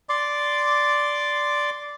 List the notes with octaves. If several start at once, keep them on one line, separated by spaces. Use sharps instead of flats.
D5 C6 D6